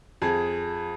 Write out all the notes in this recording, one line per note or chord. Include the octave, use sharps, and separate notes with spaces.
F2 G#4